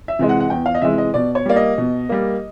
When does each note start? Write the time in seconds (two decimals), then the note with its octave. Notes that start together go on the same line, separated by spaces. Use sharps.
0.08 E5
0.19 C3 E3 G#3
0.29 F#5
0.40 F#5
0.50 E2 G5
0.66 F5
0.75 D#5
0.82 C3 E3 G#3 E5
0.98 D#5
1.14 B2 D5
1.35 C#5
1.46 G3 A#3 D5
1.56 D#5
1.78 B2
2.09 G3 A#3